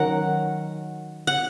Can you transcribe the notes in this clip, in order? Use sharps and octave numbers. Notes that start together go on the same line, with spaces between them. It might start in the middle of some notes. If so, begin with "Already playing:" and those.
Already playing: D#3 F#3 C#4 A#4 F#5
F#5